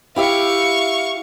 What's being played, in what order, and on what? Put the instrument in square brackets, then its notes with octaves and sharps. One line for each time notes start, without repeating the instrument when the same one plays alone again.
[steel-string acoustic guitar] E4 G4 E5 [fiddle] F5 C#6